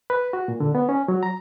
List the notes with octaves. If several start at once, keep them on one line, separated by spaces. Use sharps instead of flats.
B4
F#4
A#2
D3
B3
C#4
F#3
A#5